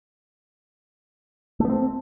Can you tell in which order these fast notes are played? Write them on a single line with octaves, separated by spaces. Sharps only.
A3 B3 C4